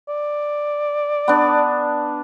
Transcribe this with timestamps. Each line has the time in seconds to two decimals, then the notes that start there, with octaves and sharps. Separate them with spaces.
0.08 D5
1.28 B3 D4